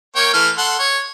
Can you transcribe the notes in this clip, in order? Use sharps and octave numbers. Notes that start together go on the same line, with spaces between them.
A#3 C#5 G5
E3 A3 F6
A4 F#5 C6
C#5